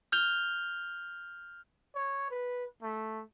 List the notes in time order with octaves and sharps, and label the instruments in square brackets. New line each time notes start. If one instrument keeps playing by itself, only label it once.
[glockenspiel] F6 G6 F7 G7
[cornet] C#5
B4
A3